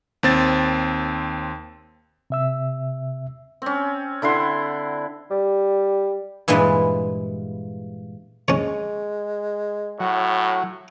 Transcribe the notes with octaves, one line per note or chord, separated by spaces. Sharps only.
D#2 C4 A6
C3 E5 E6
C4 C#4
D3 E4 F#5 C6
G3
G2 A#2 E3 G#3 B4
G#3 C#4 C#5
A2 F#3